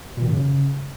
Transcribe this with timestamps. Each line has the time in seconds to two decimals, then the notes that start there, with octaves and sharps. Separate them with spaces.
0.17 A#2
0.22 D#3
0.28 F#2
0.33 C#3